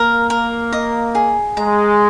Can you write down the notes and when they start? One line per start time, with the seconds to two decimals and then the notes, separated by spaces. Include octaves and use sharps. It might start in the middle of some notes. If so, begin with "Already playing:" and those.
Already playing: A#3 A#4
0.30 A#4
0.73 D#5
1.15 G#4
1.57 G#3 A#5